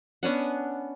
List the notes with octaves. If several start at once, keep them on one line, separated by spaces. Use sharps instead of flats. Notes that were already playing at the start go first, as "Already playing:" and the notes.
B3 C#4 D4 F#5